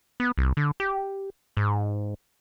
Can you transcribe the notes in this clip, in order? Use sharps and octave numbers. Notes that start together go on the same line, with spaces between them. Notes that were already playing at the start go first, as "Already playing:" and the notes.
B3
C2
D3
G4
G#2